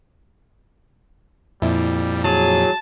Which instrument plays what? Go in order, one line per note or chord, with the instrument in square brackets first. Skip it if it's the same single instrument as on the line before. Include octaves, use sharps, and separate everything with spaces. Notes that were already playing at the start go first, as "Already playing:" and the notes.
[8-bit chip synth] F2 A#2 [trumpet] G3 [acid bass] E4
[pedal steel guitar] F#3 G#4 [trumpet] A5